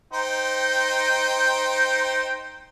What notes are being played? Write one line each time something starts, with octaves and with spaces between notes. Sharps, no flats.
D#4 C5 G5